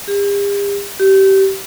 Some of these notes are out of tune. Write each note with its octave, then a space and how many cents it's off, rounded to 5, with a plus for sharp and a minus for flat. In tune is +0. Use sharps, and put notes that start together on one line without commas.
G4 +45
G4 -25